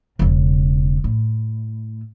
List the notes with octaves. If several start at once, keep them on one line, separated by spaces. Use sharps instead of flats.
E1 C#3
A2